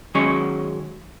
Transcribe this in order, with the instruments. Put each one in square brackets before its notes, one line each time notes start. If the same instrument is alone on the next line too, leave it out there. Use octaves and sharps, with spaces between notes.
[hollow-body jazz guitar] D#3 F#3 G#3 C#4 C#5